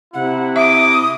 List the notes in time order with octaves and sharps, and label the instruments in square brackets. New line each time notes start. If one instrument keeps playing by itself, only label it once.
[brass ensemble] C3 E4 [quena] F#5
[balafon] E5 [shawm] D6 [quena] D#6